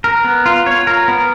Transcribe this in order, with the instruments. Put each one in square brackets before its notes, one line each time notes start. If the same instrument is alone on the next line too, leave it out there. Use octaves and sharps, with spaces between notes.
[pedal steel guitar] A#4
B3
F4
C#5
A#4
B3